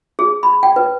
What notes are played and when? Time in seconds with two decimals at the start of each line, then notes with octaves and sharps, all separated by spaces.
0.19 G#4
0.43 B5
0.63 G5
0.76 B4